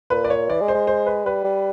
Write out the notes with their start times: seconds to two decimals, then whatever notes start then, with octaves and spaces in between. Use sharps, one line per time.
0.10 A#2 B4
0.24 D5
0.30 C#5
0.50 E3 D5
0.61 G#3
0.68 C5
0.74 G#3
0.87 C5
1.06 B4
1.25 G3 B4
1.44 G3